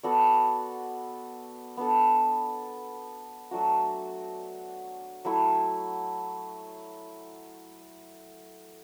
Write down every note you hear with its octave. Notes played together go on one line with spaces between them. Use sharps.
B3 F#4 A4 D5
B3 D4 A4
F#3 A3 D4 F#4
F#3 A3 E4